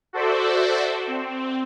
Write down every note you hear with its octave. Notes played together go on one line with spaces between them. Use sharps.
F#4 A4 C5 D5 E5
C4